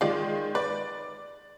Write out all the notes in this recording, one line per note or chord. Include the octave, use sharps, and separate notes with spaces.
D#3 G#3 F4 D5
B4 D5